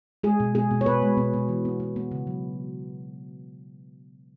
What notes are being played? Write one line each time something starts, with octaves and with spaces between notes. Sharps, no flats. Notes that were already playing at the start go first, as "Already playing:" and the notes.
G#3 G#4
B2
B2 G#4
B2
C#5
B2 B4
G#3
B2
B2
E3
B3
B3
B3
C#3
F#3